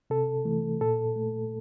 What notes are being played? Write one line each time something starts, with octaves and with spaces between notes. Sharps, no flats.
C3 A4
E3 A3
A#2 A4
A3